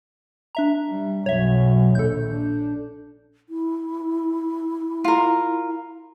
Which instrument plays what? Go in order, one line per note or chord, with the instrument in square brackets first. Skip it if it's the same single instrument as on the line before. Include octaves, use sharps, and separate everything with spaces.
[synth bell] D4 E5 A#5
[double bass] G3
[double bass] B1 F#2 [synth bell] C#5 E5
[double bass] A#1 D#2 [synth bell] A4 G6
[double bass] D4
[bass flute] E4
[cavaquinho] F4 A#4